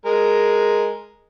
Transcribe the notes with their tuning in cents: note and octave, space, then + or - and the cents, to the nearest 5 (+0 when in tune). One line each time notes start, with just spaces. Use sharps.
G#3 +0 A#4 +0